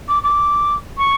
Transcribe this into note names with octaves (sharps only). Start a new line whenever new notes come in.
D6
D6
C#6